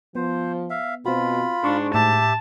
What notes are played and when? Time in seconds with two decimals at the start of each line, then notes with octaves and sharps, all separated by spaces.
0.15 F3 B3 C5
0.70 E5 F5
1.05 B2 C4 F4 F#4 B5
1.64 G#2 D4 C6 C#6
1.94 A2 G4 E5 A5